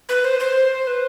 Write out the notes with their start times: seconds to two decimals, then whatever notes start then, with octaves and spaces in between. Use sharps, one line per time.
0.09 B4
0.25 C5
0.40 C5
0.87 B4